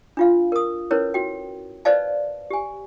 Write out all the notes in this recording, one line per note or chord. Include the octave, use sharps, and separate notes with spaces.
D4 F4 F5
A#4 D#6
C#4 E4 A#4 B4 C#5
F#4 G5
B4 C5 D5 D#5 F5 A5
G4 G#5